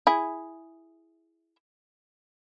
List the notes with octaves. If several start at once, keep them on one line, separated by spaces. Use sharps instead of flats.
E4 G#4